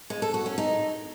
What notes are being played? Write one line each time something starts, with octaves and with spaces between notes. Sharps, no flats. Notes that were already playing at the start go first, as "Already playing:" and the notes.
G#3
A4
F#4
C#4
D#4